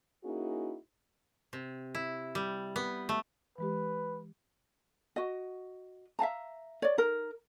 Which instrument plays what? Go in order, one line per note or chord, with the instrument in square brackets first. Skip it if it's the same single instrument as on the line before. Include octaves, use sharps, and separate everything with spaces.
[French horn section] A#3 C#4 D#4 E4 F#4 G#4
[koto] C3
E4
G3
B3
A3
[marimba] E3 G#3 G4 [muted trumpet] B4
[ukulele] F#4 D#5
E5 F5 A5 A#5
C#5 D5
D#4 A#4